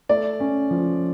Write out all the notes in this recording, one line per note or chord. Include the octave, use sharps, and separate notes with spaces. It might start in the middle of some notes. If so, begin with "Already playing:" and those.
A3 D5
C#4
F3